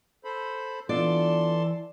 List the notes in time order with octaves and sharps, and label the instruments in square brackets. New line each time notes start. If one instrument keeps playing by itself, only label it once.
[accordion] A4 C5 B5
[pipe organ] E3 [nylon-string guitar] B3 D4 F4 [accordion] A4 A5 C6 [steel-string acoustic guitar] D5